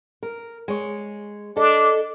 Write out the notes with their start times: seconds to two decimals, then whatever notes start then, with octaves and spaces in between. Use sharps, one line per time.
0.23 A#4
0.68 G#3 C#5
1.57 D4 A4 D#5